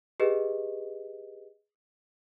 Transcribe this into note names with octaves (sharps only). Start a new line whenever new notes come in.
G4 G#4 B4 D#5